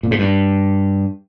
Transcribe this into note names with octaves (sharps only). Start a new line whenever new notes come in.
A#2
G#2
G2